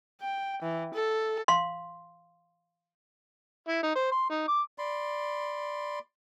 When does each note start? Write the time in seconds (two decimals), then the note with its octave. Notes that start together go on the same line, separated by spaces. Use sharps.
0.21 G5
0.62 E3
0.94 A4
1.48 F5 C6
3.68 E4
3.83 D#4
3.95 C5
4.12 C6
4.30 D#4
4.48 D6
4.78 D5 B5 C6